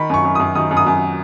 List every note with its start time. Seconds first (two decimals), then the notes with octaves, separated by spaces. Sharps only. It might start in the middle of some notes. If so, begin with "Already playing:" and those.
Already playing: D#3 B5
0.10 F#2 C#6
0.25 F#2
0.35 F#2 D#6
0.55 D#3 D#6
0.71 F#2
0.77 D#6
0.87 F#2